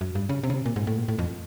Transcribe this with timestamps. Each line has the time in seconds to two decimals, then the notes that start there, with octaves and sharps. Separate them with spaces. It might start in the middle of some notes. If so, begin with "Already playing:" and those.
0.01 F#2
0.15 G2
0.29 C#3
0.43 C3
0.50 C#3
0.54 C3
0.66 A#2
0.76 G#2
0.87 A2
0.97 A#2
1.08 A2
1.19 F2